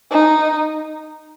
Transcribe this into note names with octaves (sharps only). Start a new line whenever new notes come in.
D#4